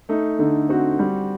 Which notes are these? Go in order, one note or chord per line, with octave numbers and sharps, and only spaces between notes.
A3 D#4
D3 D#4
C4 F#4
G3